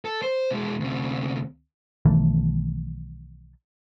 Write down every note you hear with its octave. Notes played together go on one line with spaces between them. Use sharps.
A4
C5
B2 G#3
D2 C3
B1 D#3 E3 A3